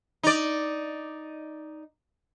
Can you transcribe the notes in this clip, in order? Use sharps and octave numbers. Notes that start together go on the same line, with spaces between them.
D#4 D5